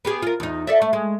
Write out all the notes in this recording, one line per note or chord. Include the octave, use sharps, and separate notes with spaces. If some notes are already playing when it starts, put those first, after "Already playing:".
B3 G4 G#4
F4 A#4
E2 D#4
A4 D5 E5
A3
G#3